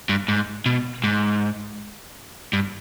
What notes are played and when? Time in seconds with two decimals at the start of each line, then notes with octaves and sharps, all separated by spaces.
0.09 G2
0.28 G#2
0.66 B2
1.04 G#2
2.53 G2